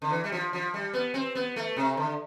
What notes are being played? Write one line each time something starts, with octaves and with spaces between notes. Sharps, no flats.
D3
E3
G3
F3
F3
G3
B3
C4
B3
A3
C3
D3